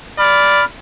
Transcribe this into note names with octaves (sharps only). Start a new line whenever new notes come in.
D5 B5 F6